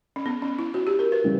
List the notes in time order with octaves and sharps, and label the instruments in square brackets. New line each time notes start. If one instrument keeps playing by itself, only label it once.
[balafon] C#4
B3
C#4
E4
F#4
G4
A#4
B4
[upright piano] C#3 E3 G3